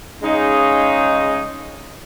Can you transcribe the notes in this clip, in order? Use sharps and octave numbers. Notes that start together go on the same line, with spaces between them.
C#3 G#3 D#4